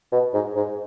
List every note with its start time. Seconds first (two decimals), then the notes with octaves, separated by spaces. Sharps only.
0.12 B2
0.34 G#2
0.56 G#2